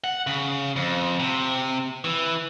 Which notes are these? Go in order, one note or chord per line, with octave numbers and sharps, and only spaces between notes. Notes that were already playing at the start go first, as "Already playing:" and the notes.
F#5
C#3
F2
C3
E3